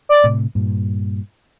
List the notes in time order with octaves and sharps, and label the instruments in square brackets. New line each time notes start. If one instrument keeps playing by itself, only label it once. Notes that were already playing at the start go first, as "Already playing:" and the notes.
[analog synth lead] D5
[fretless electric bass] A2 C3
G2 A#2